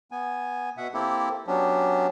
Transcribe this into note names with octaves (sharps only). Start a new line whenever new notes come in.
B3 G#5
B2 E5 F#5
A#3 C4 E4 G4 A4
F#3 B3 C#4 D4 G4